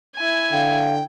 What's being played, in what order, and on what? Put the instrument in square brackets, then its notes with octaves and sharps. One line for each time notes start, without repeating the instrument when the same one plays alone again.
[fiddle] E4 G#5
[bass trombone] D3 [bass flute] F5 [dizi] G5